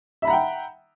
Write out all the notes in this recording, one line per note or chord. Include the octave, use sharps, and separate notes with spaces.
E5 F#5 G5 A#5 B5